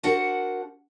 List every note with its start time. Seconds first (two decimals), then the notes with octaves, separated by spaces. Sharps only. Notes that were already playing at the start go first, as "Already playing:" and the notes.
0.03 D4 F#4 A#4 C5 F#5